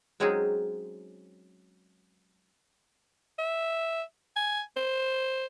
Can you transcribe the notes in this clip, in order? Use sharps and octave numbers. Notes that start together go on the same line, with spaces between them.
F#3 G#3 C4 C#4 D#4 G#4
E5
G#5
C5